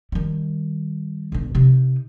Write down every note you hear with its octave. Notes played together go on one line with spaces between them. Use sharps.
D#3 G3
B1 D3
C3 D#4